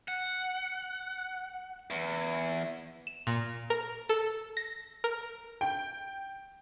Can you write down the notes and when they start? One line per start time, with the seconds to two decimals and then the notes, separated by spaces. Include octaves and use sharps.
0.08 F#5
1.90 E2
3.07 E7
3.27 A#2
3.70 A#4
4.09 A4
4.57 A#6
5.04 A#4
5.61 G5